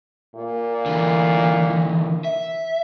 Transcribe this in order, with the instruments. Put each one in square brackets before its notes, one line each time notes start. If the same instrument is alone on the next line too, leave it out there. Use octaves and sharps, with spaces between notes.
[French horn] A#2
[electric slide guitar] D3 E3
E5